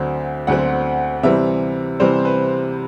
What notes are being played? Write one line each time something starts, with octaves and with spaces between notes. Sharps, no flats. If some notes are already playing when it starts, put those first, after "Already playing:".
Already playing: D2 D3 F#3 C4
D2 D3 F#3 C4 F#5
C3 E3 G3 C4 E5
C3 E3 G3 C4 C5
B4